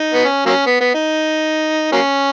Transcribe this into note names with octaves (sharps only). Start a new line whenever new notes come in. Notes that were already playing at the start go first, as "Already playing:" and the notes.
Already playing: D#4
B3
C#4
F#3 A#3 C#4
B3
B3
D#4
F#3 A#3 C#4